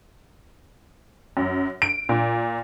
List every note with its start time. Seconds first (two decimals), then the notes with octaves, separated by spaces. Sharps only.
1.37 F#2
1.82 D7
2.09 A#2